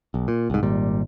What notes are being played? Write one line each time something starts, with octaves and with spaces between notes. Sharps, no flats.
B1
A#2
C2 G#2
G#1 A#2 G3